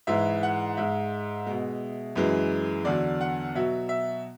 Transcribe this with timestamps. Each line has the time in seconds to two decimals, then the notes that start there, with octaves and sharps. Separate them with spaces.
0.07 G#2 E3 G#3 E5
0.43 F#5
0.77 G#2 G#3 E5
1.47 B2 G#3
2.16 F#2 E3 G#3
2.85 E2 D3 F#3 D5
3.21 F#5
3.55 B2 F#3 E5
3.89 E5